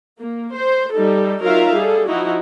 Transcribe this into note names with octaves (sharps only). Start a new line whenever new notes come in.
A#3
C5
G3 D#4 A4
F#3 D#4 F4 A#4 E5 F5
G3 G#4 A4
F3 D#4 E4 F#4